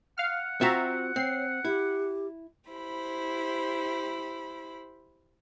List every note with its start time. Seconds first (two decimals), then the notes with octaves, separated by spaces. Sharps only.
0.18 F5 F#5 F6
0.61 C4 F4 F#4 E5 A#5
1.16 C4 C#5 C7
1.65 E4 G4
2.69 E4 G4 C5 B5